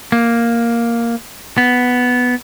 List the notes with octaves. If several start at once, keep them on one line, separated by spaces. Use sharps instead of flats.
A#3
B3